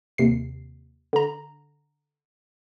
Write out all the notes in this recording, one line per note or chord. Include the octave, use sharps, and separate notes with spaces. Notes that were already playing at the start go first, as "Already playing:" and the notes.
D#2 C3 C7
D3 A#5